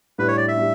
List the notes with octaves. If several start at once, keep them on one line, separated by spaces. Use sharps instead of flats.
A2 G3 D4 B4
C#5
D5
E5
G3 D4